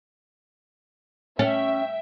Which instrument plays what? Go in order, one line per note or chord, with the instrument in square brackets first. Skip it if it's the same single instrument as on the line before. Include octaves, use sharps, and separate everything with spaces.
[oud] C#4 [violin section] E5 G5